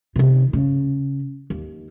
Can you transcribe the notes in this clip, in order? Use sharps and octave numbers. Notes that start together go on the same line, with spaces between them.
C3 D#3
C#3
D#2